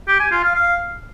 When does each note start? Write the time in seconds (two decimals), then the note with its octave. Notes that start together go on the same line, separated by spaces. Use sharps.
0.08 G4
0.20 G#5
0.31 F4
0.43 F5
0.55 F5